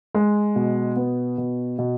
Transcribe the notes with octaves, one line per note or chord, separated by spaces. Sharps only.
G#3
B2
B3
B2
B2